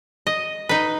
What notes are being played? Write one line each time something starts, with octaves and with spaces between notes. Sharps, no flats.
D#5
D#4 B4